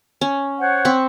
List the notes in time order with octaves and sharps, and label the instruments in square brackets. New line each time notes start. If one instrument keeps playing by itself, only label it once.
[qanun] C#4
[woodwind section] C5 C#5 F#5
[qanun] C4 B5 C#6